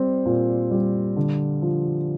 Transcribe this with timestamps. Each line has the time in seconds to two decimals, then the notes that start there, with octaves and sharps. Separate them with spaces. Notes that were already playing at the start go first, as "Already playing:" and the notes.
Already playing: G3 C4
0.25 A#2
0.71 G3
1.16 D3
1.62 F3